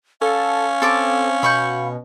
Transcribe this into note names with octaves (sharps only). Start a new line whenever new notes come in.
C#4 A4 F5
C4 A4 A5 D6
B2 B5 C#6 G6